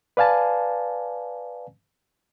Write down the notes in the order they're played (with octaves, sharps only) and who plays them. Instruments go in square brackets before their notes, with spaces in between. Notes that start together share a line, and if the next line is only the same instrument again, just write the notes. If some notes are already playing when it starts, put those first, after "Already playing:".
[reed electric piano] B4 D5 F5 G#5 A5